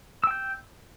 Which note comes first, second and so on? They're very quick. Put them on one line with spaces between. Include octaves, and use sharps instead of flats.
E6 G5 G6